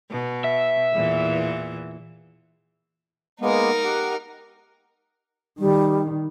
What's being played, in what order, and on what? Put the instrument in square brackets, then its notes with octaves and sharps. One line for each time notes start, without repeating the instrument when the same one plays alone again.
[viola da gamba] B2
[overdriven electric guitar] E5
[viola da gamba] E2 A#2 E3
[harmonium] G#3 A#3 B3 [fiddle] D#4 A#4
[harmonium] G4 F#5
[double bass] D#3 [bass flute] G3